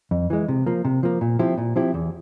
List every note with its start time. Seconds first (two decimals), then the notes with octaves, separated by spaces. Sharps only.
0.11 F2
0.30 E3 G#3
0.48 C3
0.66 F3 A#3
0.85 C3
1.03 F3 A#3
1.21 A#2
1.39 F3 C4 E4 G4
1.58 A#2
1.76 F3 C4 E4 G4
1.94 E2